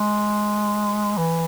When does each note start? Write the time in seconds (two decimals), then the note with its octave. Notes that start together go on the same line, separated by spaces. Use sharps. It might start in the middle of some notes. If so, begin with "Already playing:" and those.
Already playing: G#3
1.18 E3